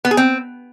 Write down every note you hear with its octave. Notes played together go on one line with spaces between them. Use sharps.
B3
G#4
C4